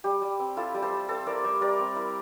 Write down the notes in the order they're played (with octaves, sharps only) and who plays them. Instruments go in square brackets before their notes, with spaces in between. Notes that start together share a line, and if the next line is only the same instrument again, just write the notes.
[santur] G3 G4
G3
C4
E4 F4 A4
G3
A4 C5
G3
C4 A4 C5
E4 A#4 D5
G3 C5 E5
G3 A#4 D5
C4
E4